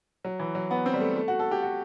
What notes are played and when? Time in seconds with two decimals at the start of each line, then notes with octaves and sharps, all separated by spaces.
0.24 F#3
0.39 E3
0.55 F#3
0.71 B3
0.86 C4
0.94 G3
1.00 A3
1.16 A3
1.28 F#4
1.39 A4
1.51 G4
1.62 F#4